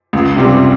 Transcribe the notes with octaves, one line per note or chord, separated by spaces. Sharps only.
C#2
C3 G3 C4